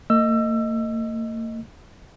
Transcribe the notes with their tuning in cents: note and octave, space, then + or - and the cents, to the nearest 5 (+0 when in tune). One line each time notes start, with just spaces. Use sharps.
A#3 -45 D#5 +0 E6 +25